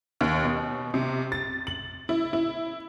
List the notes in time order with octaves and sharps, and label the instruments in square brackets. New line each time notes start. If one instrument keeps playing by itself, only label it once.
[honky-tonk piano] D#2
B2
C3
A6
F#7
E4
E4